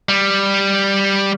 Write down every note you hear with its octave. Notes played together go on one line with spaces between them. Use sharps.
G3